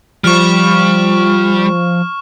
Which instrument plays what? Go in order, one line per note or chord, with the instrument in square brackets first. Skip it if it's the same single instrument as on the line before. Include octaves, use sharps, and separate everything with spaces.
[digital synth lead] F3 [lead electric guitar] G3 [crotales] C#6 F6